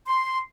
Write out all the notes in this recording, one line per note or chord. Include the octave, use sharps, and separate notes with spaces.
C6